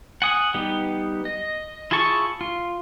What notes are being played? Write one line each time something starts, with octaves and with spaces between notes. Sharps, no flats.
F#5 G#5 D#6
G3 B3 D#4 G4
D#5
E4 F4 G#4 A5 C#6
F4